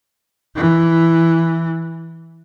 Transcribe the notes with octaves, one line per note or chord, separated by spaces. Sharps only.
E3